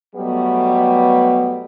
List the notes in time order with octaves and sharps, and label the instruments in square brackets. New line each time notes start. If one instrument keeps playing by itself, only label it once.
[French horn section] B2 F#3 G3 A3 B3